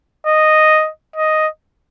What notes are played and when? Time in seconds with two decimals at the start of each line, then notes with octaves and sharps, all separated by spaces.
0.27 D#5
1.16 D#5